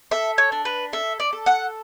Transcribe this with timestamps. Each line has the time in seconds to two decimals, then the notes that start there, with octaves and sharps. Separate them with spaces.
0.11 A4 E5
0.38 C#5
0.52 D4
0.65 B4
0.93 A4 E5
1.20 D5
1.33 A4
1.46 F#5